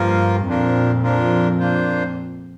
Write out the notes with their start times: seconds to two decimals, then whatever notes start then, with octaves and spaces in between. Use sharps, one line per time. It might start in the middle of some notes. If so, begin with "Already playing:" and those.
Already playing: G2 F3 A#3 F4 A#4
0.47 F2 A#2 F3 D4 F4 A#4
1.03 F3 D4 F4 A#4
1.59 A#3 D4 F4 C5